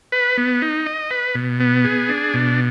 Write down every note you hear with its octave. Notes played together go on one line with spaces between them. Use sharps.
B4
B3
D#4
D#5
B4
B2
B3
G#4
D4
B2